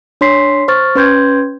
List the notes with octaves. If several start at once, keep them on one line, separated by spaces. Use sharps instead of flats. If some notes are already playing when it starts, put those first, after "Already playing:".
D4 C#5 C6 B6 C7
C5 C#6 F6 A6
C#4 B4 C6 G6 G#6